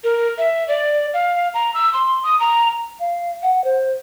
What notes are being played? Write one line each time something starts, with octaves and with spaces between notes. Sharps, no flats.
A#4
E5
D5
F5
A#5
E6
C6
D#6
A#5
F5
F#5
C5